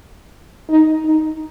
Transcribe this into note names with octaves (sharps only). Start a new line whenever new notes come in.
D#4
D#4